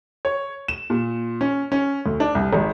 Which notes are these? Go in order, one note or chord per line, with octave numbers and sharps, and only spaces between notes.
C#5
E7
A#2
C#4
C#4
D2
D4
C2
G#1